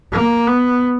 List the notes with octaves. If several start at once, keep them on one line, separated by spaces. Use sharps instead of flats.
A#3
B3